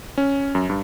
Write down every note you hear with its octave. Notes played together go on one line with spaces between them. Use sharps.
C#4
F#2
G2